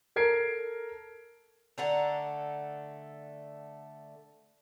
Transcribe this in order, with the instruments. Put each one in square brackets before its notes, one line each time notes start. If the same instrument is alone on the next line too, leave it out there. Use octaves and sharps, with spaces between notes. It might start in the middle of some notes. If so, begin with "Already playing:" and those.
[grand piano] A4 A#4 G#6 C7 D7
[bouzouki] D3 A3 F#5 A#5